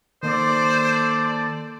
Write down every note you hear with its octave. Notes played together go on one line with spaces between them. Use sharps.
D#3 A#3 A4 C5 D5